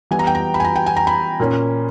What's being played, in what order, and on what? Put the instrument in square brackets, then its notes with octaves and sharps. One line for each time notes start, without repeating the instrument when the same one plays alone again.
[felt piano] E3 G3 B3 G#5
A#5
G5
A#5
B5
G#5
A#5
G5
G#5
A#5
B5
A#2 A#3 C#4